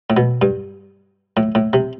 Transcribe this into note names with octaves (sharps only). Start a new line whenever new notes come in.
A2
B2
G2
A2
A2
C3